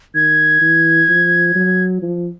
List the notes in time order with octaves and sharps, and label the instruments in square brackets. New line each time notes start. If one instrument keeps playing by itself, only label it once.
[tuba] D#3 [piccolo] G#6
[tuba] E3
F3
F#3
F3